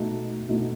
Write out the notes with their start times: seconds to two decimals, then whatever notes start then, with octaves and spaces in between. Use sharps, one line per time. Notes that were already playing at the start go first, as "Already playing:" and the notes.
Already playing: B2 A3 D#4 F#4
0.48 B2 A3 D#4 F#4